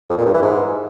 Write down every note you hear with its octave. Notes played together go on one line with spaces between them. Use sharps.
F2
A#2
G2
E3
G#2